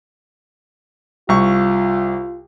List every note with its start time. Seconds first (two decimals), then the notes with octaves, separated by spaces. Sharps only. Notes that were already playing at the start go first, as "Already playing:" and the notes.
1.29 C2 F4 C#6